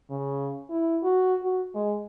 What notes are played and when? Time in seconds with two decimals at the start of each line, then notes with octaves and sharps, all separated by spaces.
0.10 C#3
0.70 E4
1.03 F#4
1.44 F#4
1.75 G#3